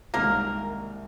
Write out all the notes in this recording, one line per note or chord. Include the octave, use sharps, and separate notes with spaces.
C2 C3 D#3 G#3 A#3 A#4